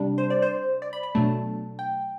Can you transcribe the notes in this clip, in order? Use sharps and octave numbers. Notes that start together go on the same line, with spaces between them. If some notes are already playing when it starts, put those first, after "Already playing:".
Already playing: C3 G3 D4
C5
D5
C5
D5
B5
B5
B2 F#3 A3 D4 A5
G5